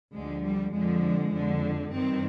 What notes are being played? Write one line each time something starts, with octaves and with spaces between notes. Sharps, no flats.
D2 D3 F3 G#3
G3
F2 D3 F3 G#3
F2 D3 F3
G2 D#3 C4